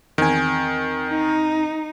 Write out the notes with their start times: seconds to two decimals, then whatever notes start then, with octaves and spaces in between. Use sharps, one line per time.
0.18 E2 D#3 C4 G#5
1.09 D#4